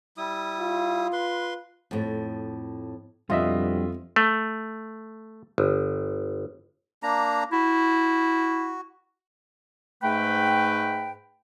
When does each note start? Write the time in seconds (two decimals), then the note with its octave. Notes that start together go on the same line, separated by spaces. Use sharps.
0.18 G3 E4 D#6
0.60 F4
1.13 B4 C6
1.91 F2 A2
3.30 F2 B2 G3 D4 F4 F#4 D#5 E5
4.16 A3
5.58 G1
7.03 A#3 D4 A#5
7.52 E4 F#4
10.03 G#2 A3 B4 G5